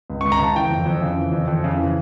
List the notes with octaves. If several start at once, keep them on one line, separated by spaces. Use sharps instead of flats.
C#2
C#2 C#6
A#5
C#3 A5
E3 G5
F2
F2
C#3
E3
F2
F2
C#3
E3